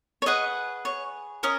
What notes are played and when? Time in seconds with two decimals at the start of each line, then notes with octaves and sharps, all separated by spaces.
0.22 C#5
0.26 G#4 B4 D#5 F#5
0.85 C#5
1.43 C#4 A#4 D#5